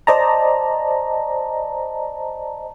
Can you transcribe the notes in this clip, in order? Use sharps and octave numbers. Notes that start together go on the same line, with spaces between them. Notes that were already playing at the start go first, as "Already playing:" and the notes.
C5 D5 D#5 A5 A#5